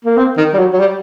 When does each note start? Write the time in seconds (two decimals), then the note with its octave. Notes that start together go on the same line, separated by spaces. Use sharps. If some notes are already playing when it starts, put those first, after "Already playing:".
0.05 A#3
0.17 C4
0.37 D#3
0.53 G3
0.59 F#3
0.73 F#3
0.80 G3